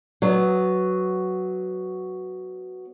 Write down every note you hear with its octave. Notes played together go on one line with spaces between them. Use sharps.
F#3 B3